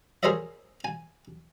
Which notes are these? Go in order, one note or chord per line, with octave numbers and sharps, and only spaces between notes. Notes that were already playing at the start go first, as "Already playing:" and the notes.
G#4 A#4 C5 C#5 D#5 E5
G#5